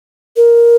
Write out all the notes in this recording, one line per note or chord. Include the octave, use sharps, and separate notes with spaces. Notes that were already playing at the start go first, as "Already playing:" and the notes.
A#4